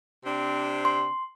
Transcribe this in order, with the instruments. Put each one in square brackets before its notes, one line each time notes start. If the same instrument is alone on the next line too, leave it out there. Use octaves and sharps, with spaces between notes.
[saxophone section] C3 C4 D4
[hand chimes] C6